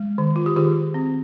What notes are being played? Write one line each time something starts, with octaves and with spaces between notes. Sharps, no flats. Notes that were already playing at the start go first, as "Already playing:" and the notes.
Already playing: G#3
D#3
F4
G4
D#3 F4 G#4
C4